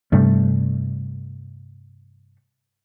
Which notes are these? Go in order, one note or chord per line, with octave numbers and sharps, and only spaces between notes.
G2 C3 G3 A3